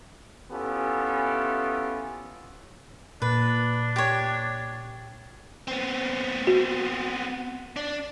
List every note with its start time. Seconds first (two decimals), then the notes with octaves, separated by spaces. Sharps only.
0.51 B3 C#4 E4 F4 G4 A4
3.22 A#2 D4 B4
3.96 G4 C#5
5.68 B3 C4
6.47 F#4
7.76 D4